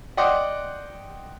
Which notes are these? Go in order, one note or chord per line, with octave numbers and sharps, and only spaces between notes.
D5 D#5 F#5 G5 C6